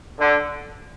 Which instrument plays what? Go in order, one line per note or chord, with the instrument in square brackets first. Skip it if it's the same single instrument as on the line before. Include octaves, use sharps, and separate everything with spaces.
[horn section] D3